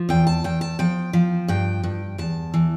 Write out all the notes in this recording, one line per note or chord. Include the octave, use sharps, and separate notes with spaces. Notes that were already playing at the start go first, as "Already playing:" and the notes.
Already playing: F3
E2 G5
A5
E2 G5
A5
F3 G5
F3
G2 G5
G2
E2 A5
E3